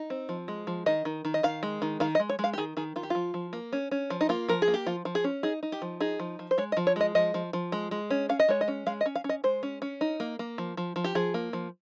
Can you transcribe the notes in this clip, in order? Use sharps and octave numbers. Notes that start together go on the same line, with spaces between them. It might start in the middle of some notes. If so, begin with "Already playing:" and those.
Already playing: D#4
C4
F3
G#3
F3
D#3 D#5
D#3
D#3
D#5
D#3 F5
G#3
D#3
D#3 F5
D#5
G#3
C#5
G#3
F5
G4
D#3 G#4
D#3 G#4
D#3 F4
G4
F3 F4
F3
A#3
C#4
C#4
F3
D#4
A#3 F4
F3 A#4
G#4
A#3
G4
F3 F4
F3
G#4
C#4
D#4 G#4
D#4
G4
F3
D#4 G#4
F3
F3
C5
G#3 C#5
D#5
F3
C#5
G#3 D#5
F3 D#5
F3
F3
G#3
G#3
C#4
C#4 F5
D#5
G#3 C#5
D#5
C#4
G#3 F5
D#5
C#4
F5
C#4
D#5
G#3 C5
C#4
C#4
D#4
A#3
A#3
F3
F3
F3
G4
F3 G#4
A#3
F3